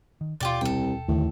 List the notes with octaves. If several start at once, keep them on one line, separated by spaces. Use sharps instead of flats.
D#3
D#1 B2 F4 G4 D5
C2 A4 G5
D#2 A2 D3 D#3